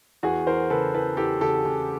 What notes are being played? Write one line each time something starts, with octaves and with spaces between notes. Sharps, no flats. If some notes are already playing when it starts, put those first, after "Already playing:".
E2 F#4 G#4
E3 A#4 C5
C#3 A4 B4
E3 A4 B4
E2 G4 A4
C#3 G4 A4
C#3